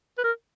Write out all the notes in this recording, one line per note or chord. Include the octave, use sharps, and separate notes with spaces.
B4
A#4